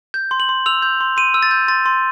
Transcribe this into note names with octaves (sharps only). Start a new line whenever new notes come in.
G6
C6
F#7
C6
E6 F7
G6
C6
C6 D#7
E6
A6
G6
C6 A6
C6